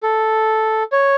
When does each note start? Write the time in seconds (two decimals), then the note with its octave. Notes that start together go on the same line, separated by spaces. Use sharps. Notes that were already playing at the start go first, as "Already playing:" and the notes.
0.03 A4
0.92 C#5